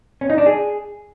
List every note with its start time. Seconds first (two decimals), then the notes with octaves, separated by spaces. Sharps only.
0.21 C#4
0.30 D#4
0.38 D4
0.46 G#4